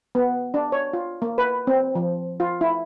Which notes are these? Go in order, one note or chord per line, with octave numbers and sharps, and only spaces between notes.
B3
D4
C#5
F4
A#3
B4
C4
F3
F4
E4